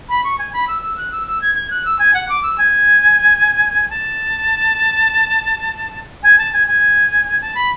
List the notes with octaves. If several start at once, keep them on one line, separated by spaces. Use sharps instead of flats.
B5
C#6
G#5
B5
E6
E6
F#6
E6
E6
G#6
G#6
F#6
E6
G#5
F#5
D6
E6
G#5
A5
G#5
A5
G#5
G#5
A5
B5